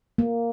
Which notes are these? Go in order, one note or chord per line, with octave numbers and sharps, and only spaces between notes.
A#3